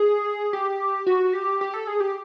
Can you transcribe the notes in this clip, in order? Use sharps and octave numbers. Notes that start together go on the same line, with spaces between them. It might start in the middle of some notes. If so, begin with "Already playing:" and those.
Already playing: G#4
G4
F#4
G4
G4
A4
G#4
G4